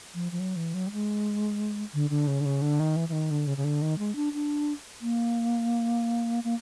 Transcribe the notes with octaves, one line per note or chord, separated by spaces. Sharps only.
F3
F3
F#3
E3
F#3
G3
G#3
D3
D3
C#3
D3
C#3
D3
D#3
E3
E3
D#3
D3
C#3
C#3
D3
D#3
G#3
D4
D4
A#3
A#3